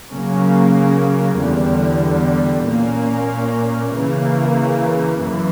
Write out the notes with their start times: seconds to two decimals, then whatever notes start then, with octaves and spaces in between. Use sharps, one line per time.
0.10 C#3 F#3 A#3 C#4
1.38 E2 D3 G3
2.65 A#2 A#3 C#4
3.94 C#3 E3 A#3
5.21 F#2 E3